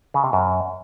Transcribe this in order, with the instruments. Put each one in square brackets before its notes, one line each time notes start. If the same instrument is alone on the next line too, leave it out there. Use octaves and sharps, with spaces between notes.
[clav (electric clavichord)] C#3
C3
F#2